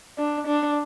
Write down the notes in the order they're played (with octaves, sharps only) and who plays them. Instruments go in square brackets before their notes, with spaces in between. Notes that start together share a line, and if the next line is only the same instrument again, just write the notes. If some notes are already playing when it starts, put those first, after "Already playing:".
[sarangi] D4
D4